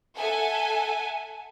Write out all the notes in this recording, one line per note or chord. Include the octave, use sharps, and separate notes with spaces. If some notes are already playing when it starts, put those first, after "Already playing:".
A4 E5 F#5 G#5